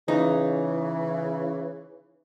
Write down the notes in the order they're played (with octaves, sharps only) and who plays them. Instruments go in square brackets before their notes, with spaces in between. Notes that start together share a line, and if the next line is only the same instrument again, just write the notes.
[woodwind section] C#3 E3 [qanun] D#4